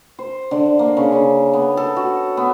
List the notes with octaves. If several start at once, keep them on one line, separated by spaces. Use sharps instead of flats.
C5
D3
A#3
C#3
C#3
B3
A4
F#4
B3